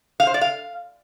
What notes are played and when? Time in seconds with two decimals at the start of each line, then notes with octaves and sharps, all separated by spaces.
0.20 F5
0.27 C5
0.34 D5
0.41 F5